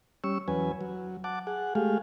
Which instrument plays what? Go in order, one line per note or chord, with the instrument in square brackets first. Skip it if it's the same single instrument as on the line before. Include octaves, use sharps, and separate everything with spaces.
[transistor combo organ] G3 C#4 C#6 E6
E2 F#3 C#4 B4 G#5
F#3
F#5 A5 D6
G#4 F#5
G#3 A3 G4 G#4 F5